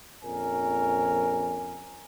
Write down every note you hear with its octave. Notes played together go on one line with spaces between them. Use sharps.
A#1 F2 C#4 A#4 G#5